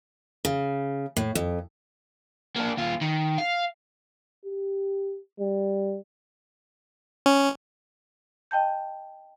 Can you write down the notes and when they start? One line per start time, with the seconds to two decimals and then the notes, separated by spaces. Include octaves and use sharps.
0.45 C#3
1.17 A2
1.35 F2
2.56 A#3 D4
2.77 D#2 F4
3.01 D#3
3.38 F5
4.46 G4
5.40 G3
7.26 C#4
8.51 D#5 G5 A5 G6